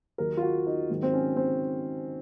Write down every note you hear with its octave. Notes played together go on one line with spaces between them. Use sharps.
D#2 D#3 F#3 A#4
F4
F#4
D#4
G#2 D#3 F#3
C4
C#4
C4